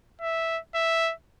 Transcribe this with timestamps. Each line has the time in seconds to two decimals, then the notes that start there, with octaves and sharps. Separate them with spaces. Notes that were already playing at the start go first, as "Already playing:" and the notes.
0.22 E5
0.75 E5